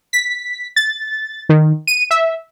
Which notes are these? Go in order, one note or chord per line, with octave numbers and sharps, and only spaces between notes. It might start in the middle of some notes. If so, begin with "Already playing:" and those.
B6
A6
D#3
D#7
E5